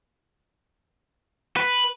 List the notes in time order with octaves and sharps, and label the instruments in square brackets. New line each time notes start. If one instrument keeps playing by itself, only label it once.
[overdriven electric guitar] B4